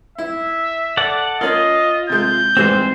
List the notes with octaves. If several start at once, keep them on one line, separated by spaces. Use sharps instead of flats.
E4 E5
A4 D5 F#5
C#4 F4 A#4 D#5
C3 G#3 G6
G#2 E3 G3 C4 C5